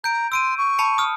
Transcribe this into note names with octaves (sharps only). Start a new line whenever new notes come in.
A#5 G6 D7
C6 E6 D7 D#7
C#6
A5 B5 C#7
D#6 F6